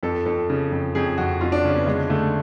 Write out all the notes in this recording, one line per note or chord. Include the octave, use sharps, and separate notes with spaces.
F2 A4
F2 A4
C#3
F2
F2 G#4
F2 F#4
F2 F4
D4
C#3 C#4
B3
D3 G#3
D3 A3